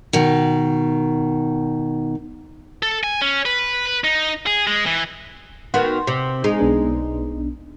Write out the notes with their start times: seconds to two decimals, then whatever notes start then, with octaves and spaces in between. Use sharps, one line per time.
0.13 B2 D#3
2.83 A4
3.04 G#5
3.22 C#4
3.45 B4
3.86 B4
4.04 D#4
4.46 G#4
4.67 G#3
4.86 E3
5.74 D#3 B3 F#4 C6
6.07 C3
6.44 G#3 D#4
6.59 B1 B3 D4